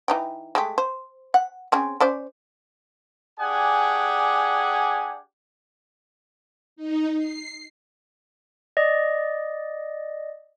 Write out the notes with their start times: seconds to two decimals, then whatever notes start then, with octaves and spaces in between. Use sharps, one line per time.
0.08 E3 D#4 G5
0.55 G#3 A3 G4
0.78 C5
1.34 F#5
1.72 C4 C#4 G#4
2.00 C#4 C5 D5
3.40 D4 G4 G#4 D5 F#5 G#5
6.76 D#4
7.17 C7
8.77 D5 D#5